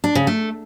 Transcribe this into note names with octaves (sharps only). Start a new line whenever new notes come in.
D4
C#3
A3